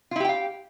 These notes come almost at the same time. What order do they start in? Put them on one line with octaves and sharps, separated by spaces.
F4 E4 G4 G5 F5